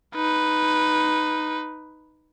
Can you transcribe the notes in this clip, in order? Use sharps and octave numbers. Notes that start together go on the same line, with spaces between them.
D#4 B4